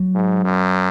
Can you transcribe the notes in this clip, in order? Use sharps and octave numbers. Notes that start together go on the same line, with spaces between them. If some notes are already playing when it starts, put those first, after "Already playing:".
Already playing: F#3
G#2
F#2